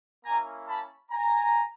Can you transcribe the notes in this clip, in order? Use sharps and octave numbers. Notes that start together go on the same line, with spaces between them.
A#3 C#4 E4 G#5 A#5
A5 B5
G#5 A#5